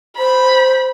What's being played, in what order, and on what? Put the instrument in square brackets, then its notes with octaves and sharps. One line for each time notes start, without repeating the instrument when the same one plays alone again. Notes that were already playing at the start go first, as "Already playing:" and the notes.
[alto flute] C5 [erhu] B5